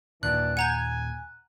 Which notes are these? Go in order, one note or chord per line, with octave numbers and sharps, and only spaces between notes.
D#2 A#2 E3 D4 F#4 F#6
F#5 G#5 A#5 G6